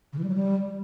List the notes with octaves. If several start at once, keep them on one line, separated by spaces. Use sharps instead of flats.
C#3
E3
G3
F#3
G3